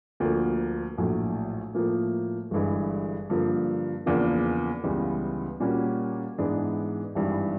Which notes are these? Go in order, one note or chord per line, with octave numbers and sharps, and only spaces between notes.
D2 D3 F3 A#3
A#1 A2 F#3
A2 F3 A#3
G1 G2 E3 G#3
G2 D3 F3 A#3
E2 C#3 F3 A#3 D4
C#2 C#3 E3 G3 B3
A#2 G3 A#3 C#4 F#4
G#2 E3 G#3 B3 D4
G#1 G2 E3 G3